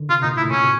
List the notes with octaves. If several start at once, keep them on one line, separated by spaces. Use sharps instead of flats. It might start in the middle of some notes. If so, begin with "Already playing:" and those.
Already playing: D3 D#3
C3 F4
A#2 D#4
A2 E4
A#2 C#4
B2